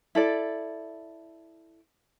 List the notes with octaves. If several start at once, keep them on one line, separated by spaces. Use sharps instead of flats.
E4 A4 D5